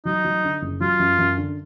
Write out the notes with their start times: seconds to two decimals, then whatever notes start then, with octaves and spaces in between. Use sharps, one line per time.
0.05 F#3 D#4
0.24 F#3
0.44 D3
0.62 F#1
0.81 F#3 F4
0.99 F#2
1.18 F#2
1.37 D3